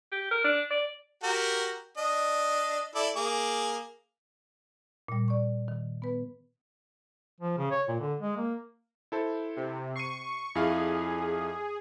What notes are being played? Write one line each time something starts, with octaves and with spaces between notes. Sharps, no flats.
G4
A#4
D4
D5
F#4 G4 A#4
D4 D#5
E4 A4 D5
A#3 G#4 D6
A#2 G3
D5 C#6
D#3
B3 B4
F3
C#3
C#5
A#2
D3
G#3
A#3
E4 A4 C5
C3
C#6 C7 D#7
F2 E4 G#4 F5